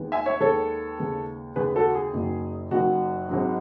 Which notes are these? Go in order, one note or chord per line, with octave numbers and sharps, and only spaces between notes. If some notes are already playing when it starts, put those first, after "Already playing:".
Already playing: D#2 D#3 G#3 B3
E5 G#5
C#5 E5
D#2 D#3 G#3 B3 A4 C#5
D#2 C#3 G#3 B3
D#2 C#3 G#3 B3 G#4 B4
F#4 A4
G#4
F#1 F#2 D#3 F#3
F#1 F#2 D#3 F#3 F#4
G#1 G#2 D#3 F#3